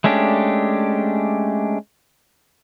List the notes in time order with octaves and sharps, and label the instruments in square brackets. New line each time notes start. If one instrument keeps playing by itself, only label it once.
[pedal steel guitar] G#3 A3 C#4 D4 G4